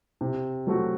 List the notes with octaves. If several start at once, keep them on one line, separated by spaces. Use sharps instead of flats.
C3
F#3 A3 C4 F#4